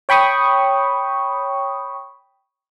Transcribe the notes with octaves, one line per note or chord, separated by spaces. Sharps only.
C#5 G5 B5 C#6 D#6